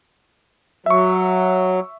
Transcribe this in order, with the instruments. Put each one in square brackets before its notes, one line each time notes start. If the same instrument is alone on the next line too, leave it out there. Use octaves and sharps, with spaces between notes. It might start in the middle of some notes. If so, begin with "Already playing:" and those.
[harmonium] F#3 [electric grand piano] E5 C#6